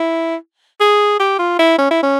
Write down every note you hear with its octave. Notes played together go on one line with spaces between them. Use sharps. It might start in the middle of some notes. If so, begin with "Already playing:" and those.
Already playing: E4
G#4
G4
F4
E4
C#4
E4
C#4